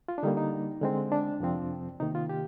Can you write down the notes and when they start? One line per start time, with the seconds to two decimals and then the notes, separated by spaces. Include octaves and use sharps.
0.08 F4
0.18 D4
0.23 D3 G3 A#3 D#4
0.37 D#4
0.82 D3 G#3 C4
1.12 D4
1.40 F2 C3 F3 C4
2.00 C3 D#3 A#3 D#4
2.15 F4
2.29 G4